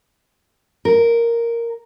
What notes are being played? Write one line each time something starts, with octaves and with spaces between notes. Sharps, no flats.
A#4